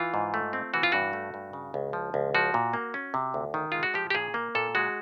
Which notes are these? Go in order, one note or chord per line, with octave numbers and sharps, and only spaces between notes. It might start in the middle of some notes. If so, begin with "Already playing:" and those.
Already playing: E3 F4
G#2
A3
C4
E3 F#4
F4
G2 F#4
A3
G2
C#3
C#2
F3
C#2
F3 F#4
A#2
A#3
C#4
C3
D2
D#3
G#3 F4
F#4
F3 G4
G4
A#2 G#4
A#3
A#2 A4
G#3 F#4